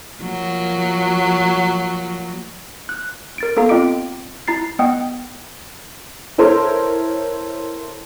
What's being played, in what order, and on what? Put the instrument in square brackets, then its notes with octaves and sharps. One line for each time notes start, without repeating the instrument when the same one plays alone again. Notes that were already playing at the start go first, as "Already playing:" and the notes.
[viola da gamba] F3 F#3 A#3
[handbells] F#6
A#4 A6 D7
A#3 B3 A4 F5 A#5
C4 F4 D#5 D6 D7
E4 A#5 A6 C7
B3 D#5 F#5 G5 D#6
[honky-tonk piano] E4 A4 A#4 C5 C#5